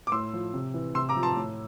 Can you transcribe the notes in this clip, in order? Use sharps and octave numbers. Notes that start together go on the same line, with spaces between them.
D6
A2 C6 E6
F3
C3
E3
C3 C6 E6
A#5 D6
F3
A5 C6
A2